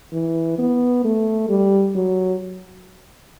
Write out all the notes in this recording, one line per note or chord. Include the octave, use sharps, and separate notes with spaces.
E3
B3
A3
G3
F#3